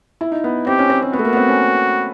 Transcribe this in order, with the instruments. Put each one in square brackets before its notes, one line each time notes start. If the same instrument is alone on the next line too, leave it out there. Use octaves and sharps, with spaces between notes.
[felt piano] E4
D#4
B3
[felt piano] C4 [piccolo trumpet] G4
[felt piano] C#4
C4
C4
[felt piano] B3 [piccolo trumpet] F#4
[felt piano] A3
A#3
B3
C4
C#4